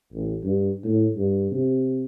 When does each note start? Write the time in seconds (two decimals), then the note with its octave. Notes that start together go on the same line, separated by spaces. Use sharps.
0.13 A1
0.43 G2
0.84 A2
1.16 G2
1.51 C3